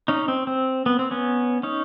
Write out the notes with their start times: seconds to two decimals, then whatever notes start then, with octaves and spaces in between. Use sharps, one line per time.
0.08 C#4 D#4
0.28 C4
0.47 C4
0.86 B3
0.99 C4
1.11 B3 C#4
1.63 C#4 D#4